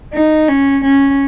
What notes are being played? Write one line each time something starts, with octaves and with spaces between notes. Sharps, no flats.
D#4
C#4
C#4